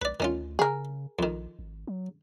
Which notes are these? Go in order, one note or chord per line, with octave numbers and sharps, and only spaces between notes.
B1 B4 D5
D2 D#3 C#4 F4
C#3 G#4 A#4
A#1 F2 D#3
G#1
F#3